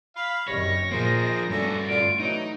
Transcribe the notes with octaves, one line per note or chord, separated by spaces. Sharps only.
F5 B5
F#1 F#2 C3 D#3 G3 C#5 A#6
A#2 D#3 F3 A#3 G#4 A#4 C5
G2 A3 C#4 D4 F#4 A4
D3 F4 D7
E3 F#3 D#4